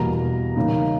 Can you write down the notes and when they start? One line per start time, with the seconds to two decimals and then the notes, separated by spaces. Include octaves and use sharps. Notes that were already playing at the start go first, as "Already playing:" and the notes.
Already playing: E2 B2 G3 A#3 A#5
0.56 C#3 G3 A#3 D#4